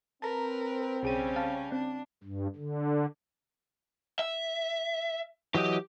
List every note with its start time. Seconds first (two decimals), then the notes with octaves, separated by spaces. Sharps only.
0.22 C4 A#4 B4 A5 A#5
1.03 B1 C#3 G3 C#4 G#4 D#7
1.36 F5 A5
1.72 C4 D4
2.24 G2
2.56 D3
4.19 E5
5.55 E3 F#3 G4 D#5